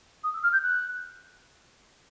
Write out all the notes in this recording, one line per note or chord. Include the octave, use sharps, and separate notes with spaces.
D#6
E6
F6
G6
F#6